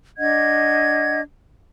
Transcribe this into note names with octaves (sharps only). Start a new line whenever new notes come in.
D4 D#5 F#5 G#6